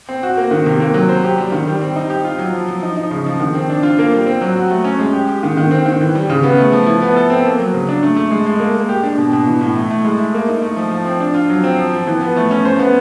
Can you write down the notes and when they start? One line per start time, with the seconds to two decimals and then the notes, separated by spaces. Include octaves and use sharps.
0.09 C4
0.23 F#4
0.37 A#3
0.51 D#3
0.66 C3
0.80 A#3
0.94 F#3
1.09 C5
1.24 G4
1.38 G3
1.52 D#3
1.67 G3
1.82 C4
1.96 D#4
2.10 G4
2.25 F4
2.39 F#3
2.53 F3
2.68 F3
2.83 D#4
2.97 D#4
3.11 C#3
3.26 F3
3.40 D#3
3.55 C4
3.70 D4
3.83 F4
3.99 A#3
4.12 G3
4.26 C4
4.41 F#3
4.55 F#4
4.71 A3
4.85 C#4
4.99 G#3
5.13 G4
5.29 G4
5.43 D#3
5.57 D#3
5.71 C4
5.86 D#3
6.01 E3
6.15 G3
6.30 C#3
6.43 B3
6.58 A3
6.72 F3
6.87 E4
7.02 B3
7.16 A4
7.30 C4
7.45 A#3
7.59 F#3
7.74 C#3
7.89 D4
8.03 A3
8.16 A3
8.31 G#3
8.46 G#3
8.60 A#3
8.75 A#3
8.89 G4
9.03 D4
9.18 B2
9.33 B2
9.47 E3
9.61 A2
9.76 A3
9.90 A3
10.04 G#3
10.19 E4
10.34 A#3
10.49 D#4
10.62 A3
10.76 F3
10.91 F3
11.05 C4
11.20 D4
11.34 F4
11.50 F#3
11.64 C4
11.77 F3
11.93 F3
12.07 E3
12.21 B3
12.36 A3
12.51 C#4
12.65 C5
12.79 B3